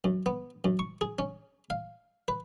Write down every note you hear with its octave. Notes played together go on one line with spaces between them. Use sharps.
F#2
B3
F#2
C#6
G#4
C#4
F5
B4